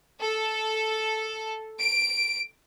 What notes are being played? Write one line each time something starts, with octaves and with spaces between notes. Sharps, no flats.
A4
D7